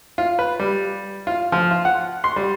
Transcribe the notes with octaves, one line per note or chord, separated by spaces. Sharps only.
F4
B4
G3
F4
F3
F4
F#5
C6
G3